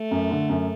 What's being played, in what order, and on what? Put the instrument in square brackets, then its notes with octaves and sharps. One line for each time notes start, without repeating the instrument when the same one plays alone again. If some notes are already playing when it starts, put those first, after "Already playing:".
Already playing: [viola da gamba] A3
[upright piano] F#2
D3
F#2